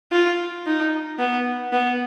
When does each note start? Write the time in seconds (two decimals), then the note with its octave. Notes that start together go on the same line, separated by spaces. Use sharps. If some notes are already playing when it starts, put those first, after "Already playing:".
0.12 F4
0.66 D#4
1.19 B3
1.72 B3